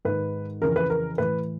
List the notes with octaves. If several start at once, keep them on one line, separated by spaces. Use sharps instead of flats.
G#2 D#3 B4
F2 C#3 E3 A#4
B4
A#4
A2 E3 B4